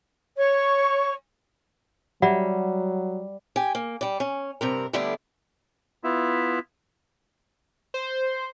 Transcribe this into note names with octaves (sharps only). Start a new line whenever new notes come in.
C#5 C#6
F#3 G3 D5 E5 F#5
G4 G#5
A#3
G3 D5
C#4
G2 C3 A#4
D3 G3 A3 B3 D4 E4
B3 E4 F4 E5
C5